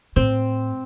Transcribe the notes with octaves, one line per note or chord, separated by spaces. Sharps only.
A2 C4